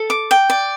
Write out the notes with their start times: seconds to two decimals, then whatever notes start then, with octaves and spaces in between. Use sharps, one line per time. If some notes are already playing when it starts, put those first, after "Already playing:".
Already playing: A4
0.10 D6
0.31 G5
0.50 D5